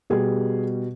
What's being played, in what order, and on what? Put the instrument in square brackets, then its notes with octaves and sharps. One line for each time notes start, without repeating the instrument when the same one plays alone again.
[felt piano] B2 G3 G#4